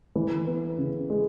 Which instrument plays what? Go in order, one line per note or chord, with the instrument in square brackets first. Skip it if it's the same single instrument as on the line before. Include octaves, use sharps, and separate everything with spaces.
[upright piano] E3
B3
C#3
G#3